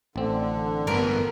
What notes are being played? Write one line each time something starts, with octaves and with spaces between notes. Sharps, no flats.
A1 D3 C4
G2 B3 A#4